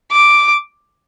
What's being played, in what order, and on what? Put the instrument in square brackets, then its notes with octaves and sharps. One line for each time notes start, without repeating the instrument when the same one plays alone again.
[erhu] D6